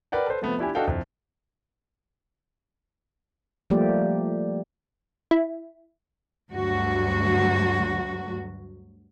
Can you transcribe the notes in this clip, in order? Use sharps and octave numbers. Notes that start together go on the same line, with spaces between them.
A#4 B4 D5 F#5 G5
A4 B4 C5
C3 F3 A3 B3
D4 E4 G4 G#5
D4 F#4 A4 D#5 F5 G5
C2 F2
F3 G3 A3 A#3 G4 D5
E4
D2 G2 F#3 F#4